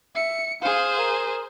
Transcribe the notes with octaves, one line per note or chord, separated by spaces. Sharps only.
E5 C#7
G#4 C5 F5
A#4